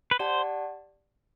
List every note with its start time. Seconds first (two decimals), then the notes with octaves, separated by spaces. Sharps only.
0.11 B4
0.19 G4 C5 D5 F#5 A5